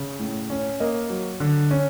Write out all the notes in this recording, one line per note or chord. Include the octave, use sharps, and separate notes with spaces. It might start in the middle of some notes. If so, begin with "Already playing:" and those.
Already playing: C#3
A2
C#4
A#3 D#5
F#3
D3
C#4